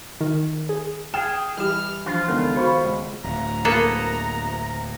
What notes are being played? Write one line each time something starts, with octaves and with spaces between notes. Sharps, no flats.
D#3
G#4
G#4 G5 F6 E7
E3 G3 E4 G4 F6
E3 F3 D4 F4
C#2 D3 D#3 B3
D#3 F#4 C5 B5 C#6
C#2
D1 A#5
A#3 B3 G#4 A4